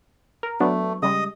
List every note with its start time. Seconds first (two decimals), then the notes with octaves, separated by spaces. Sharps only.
0.43 A#4
0.60 F#3 A3 B3 D4
1.03 C#3 G3 G#3 D#5 D#6